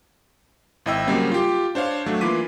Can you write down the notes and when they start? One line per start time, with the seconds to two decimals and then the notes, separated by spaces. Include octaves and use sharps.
0.86 G#1 E4 D#5 G5 E6
1.07 C#3 F#3 G3 A#3 C4
1.32 F4 G4
1.75 D4 C5 C#5 F5
2.06 F#3 A3 D4
2.21 E3 A#3 F4 D6 B6 D#7